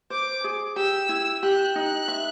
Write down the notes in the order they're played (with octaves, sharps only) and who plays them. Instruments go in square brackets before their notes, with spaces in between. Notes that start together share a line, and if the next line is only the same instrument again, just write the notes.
[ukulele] C5 [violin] D6
[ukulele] G#4
[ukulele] G4 [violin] E6
[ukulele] E4
[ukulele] G4 [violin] F#6
[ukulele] D#4 [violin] F#6
[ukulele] E5